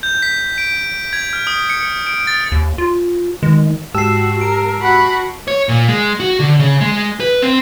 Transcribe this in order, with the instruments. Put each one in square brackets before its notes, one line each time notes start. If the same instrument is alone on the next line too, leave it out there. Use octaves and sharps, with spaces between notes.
[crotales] G6
B6
D7
G#6
F6
D#6
C#7
C#7
D7
A6
[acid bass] D#2
F4
[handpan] D#3 [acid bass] G#3
[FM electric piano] G#2 G4 E6 [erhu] F#4 [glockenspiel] A5 C7
[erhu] A#4 [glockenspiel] D7
[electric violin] F#4 F#5 [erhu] B5
[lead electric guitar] C#5
A#2
G#3
F#4
D3
C#3
G#3
B4
C4